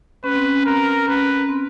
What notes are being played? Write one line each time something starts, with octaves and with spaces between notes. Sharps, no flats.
C#4 B4
C4
C#4
C4 A#4
C#4 B4
C4